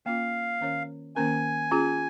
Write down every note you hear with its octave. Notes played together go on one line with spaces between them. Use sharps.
A#3 C#4 F4 F5
D#3 C#4 A#4 C#5
D#3 A#3 C#4 A#4 G#5
C#4 F4 G#4